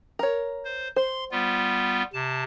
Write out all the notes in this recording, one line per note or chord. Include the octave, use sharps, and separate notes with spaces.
A#4 C#5
C5
C5 C6
G3 B3 F4
C3 A5